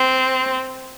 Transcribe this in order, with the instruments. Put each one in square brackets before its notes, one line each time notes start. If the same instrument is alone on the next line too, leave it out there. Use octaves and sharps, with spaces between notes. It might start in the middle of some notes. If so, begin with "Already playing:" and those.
Already playing: [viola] C4